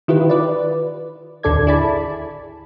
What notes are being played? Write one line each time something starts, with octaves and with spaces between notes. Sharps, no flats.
D#3 E4 F4 G4 B4
B4 D5
A1 D#2 D3 A4 D5 G#6
E4 G#4 D5 A5 B5